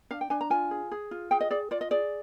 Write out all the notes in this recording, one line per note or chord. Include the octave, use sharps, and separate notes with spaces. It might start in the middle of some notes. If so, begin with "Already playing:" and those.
D4 F5
G5
D4 G#5
A#5
F4 G#5
G#4
G#4
F4
G#4 G5
D#5
G#4 D5
F4 D5
D#5
G#4 D5